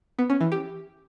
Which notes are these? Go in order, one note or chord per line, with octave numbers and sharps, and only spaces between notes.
B3
C#4
E3
G4